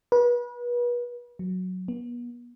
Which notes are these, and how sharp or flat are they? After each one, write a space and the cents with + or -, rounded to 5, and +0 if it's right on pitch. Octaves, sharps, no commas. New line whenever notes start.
B4 -35
F#3 -5
B3 -40